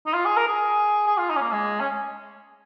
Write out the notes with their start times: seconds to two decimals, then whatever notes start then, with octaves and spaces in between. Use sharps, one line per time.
0.07 D#4
0.14 F4
0.25 G#4
0.37 A#4
0.48 G#4
1.07 G#4
1.18 F4
1.30 D#4
1.36 C#4
1.41 A#3
1.52 G#3
1.80 C#4